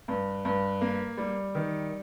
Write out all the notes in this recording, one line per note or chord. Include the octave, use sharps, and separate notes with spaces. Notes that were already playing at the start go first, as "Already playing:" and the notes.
G2
G2
A#3
G3
D#3